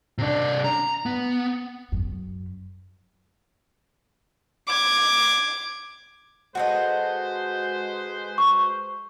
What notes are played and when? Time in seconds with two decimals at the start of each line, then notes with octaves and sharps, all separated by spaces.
0.18 C3 D4
0.64 A#5
1.06 B3
1.92 F#2
4.67 D6 G#6
6.55 G#3 F#4 A4 B4 C5 D#5
8.38 C#6